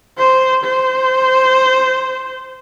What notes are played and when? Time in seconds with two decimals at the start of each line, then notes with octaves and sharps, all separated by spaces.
0.18 C5
0.64 C5